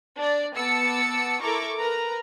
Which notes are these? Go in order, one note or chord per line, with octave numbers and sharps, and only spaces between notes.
D4 D5
B3 A5 D6 E6 C#7
E4 A4 A#4 A#5 C#6 D6
A#4 B4 A#5